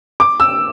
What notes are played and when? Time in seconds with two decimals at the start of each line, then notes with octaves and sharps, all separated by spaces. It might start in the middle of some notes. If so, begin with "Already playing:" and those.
0.20 D6
0.40 E6